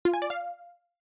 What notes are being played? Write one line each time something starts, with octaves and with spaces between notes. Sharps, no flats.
F4
G#5
D5
F5